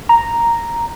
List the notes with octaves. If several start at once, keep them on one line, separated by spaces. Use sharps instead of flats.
A#5